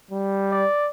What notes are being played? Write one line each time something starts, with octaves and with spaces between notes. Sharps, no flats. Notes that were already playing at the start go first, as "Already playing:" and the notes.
G3
D5